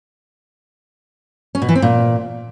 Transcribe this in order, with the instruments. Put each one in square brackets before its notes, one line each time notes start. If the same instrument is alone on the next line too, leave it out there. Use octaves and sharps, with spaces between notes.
[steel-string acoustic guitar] C#4
B2
E3
C4
A#2